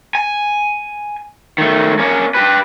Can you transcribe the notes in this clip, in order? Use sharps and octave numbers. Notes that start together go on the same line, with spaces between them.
G#5
D#3 A3
A#3 C#4
G4 B4